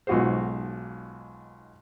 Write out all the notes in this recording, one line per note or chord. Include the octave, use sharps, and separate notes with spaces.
B1 G#2 F4 F#4 G#4 C5